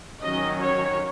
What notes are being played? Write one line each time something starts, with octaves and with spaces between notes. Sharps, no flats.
D#3 F#3 C#4 D#5
C#5